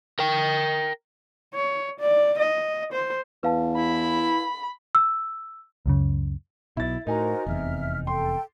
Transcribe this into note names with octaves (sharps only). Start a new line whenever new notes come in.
A#4 G5
C#5
D5
D#5
C5
E2 B4 F5 A5
E4 B5
E6
C#2 F#2 C#3
B1 B2 E4 A6
A2 D#4 F#4 A#4 C5 G#5 A#5
F1 E2 C3 E5 F6
A4 G5 C6